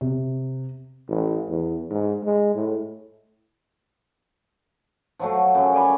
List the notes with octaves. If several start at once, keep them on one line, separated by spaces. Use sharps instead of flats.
C3
A1
E2
G#2
G#3
A2
F3 F#3 A3
F#2 C#3
C#5 D5 G#5 B5